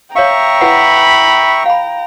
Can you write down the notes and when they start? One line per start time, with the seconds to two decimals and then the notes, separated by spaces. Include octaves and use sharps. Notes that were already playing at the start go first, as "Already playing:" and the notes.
0.16 C#5 E5 F5 G5 A#5 C#6
0.61 E4 B4 F#5 B5
1.66 F5 B5